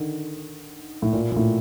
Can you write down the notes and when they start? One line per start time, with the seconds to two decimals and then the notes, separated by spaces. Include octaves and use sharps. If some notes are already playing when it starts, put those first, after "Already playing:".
Already playing: D3 D#3
1.02 A2
1.13 A#2
1.32 A#2
1.36 A2